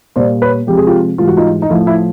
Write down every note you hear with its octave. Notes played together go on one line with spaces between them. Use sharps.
A#2 G3 C5 D5
B4 C#5
C3 F3 G#3 G4
G#4
F4 G4
G#2 E3 G3 F4
F#4
D#4 F4
D#4
A2 F3 A3 E4
E4